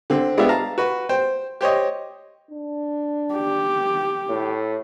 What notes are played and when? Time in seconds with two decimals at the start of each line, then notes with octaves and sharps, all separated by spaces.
0.10 D3 C4
0.38 G#3 B3 D4 F4 G4 E5
0.49 F5 A5 A#5
0.78 F#4 B4
1.09 C5 G5
1.61 G4 C5 C#5 D#5
2.51 D4
3.34 G4
4.29 A2